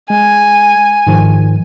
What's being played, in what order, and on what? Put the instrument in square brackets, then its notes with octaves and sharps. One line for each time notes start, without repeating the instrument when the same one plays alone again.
[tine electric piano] G#3 [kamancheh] G#5
[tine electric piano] G#2 D#3 F3